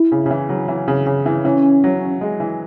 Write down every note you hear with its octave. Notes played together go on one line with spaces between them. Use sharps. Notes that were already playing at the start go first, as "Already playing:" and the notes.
Already playing: E4
C#3
C#3
E3
F#3
E3
C#3
C#3
E3
E3 C#4
F#3
G#3
E3